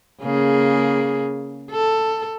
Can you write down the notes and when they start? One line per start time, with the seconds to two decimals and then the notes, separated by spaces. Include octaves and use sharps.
0.22 C#3 A#3 G#4
1.71 A4